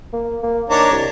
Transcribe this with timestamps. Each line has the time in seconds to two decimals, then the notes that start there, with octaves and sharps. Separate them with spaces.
0.13 A#3
0.43 A#3
0.70 D#3 D4 C#5 A#5
0.91 C2